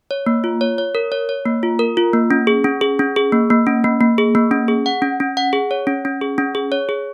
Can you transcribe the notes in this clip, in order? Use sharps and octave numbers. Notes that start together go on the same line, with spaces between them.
C#5
A#3
F4
C#5
C#5
A#4
C#5
C#5
A#3
F4
A#4
F4
A#3
C#4
G#4
C#4
G#4
C#4
G#4
A#3
A#3
C#4
A#3
A#3
G#4
A#3
C#4
G#4
F#5
C#4
C#4
F#5
G#4
C#5
C#4
C#4
G#4
C#4
G#4
C#5
G#4